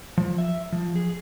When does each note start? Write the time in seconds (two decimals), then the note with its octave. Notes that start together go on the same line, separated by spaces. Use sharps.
0.18 F3
0.38 E5
0.72 F3
0.96 G#4